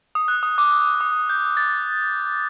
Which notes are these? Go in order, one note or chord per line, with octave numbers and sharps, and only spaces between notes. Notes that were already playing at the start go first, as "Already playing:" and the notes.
D#6
F#6
D#6
D6
D6
D#6
G6
A6